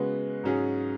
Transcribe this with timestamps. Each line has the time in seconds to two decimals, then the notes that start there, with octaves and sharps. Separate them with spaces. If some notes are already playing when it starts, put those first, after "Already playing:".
Already playing: C#3 G#3 B3 F#4 B4
0.44 G#2 F#3 C#4 G#4